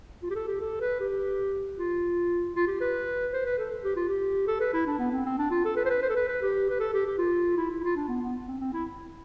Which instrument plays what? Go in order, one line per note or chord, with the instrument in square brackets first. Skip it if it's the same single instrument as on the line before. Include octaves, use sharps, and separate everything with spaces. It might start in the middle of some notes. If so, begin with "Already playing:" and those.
[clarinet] F4
G4
A4
G4
A4
B4
G4
F4
F4
G4
B4
C5
B4
A4
G4
F4
G4
A4
B4
E4
D4
B3
C4
C4
D4
F4
A4
B4
C5
B4
C5
A4
B4
B4
G4
B4
A4
G4
G4
F4
E4
E4
F4
D4
B3
B3
C4
C4
E4